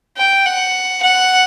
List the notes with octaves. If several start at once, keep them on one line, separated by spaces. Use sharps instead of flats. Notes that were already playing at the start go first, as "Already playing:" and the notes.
G5
F#5
F#5